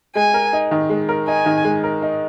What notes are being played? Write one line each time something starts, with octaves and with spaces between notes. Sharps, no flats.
G#3 G#5
A#4
D#4
D#3
G#3
A#4
D#4 G#5
D#3
G#3
A#4
D#4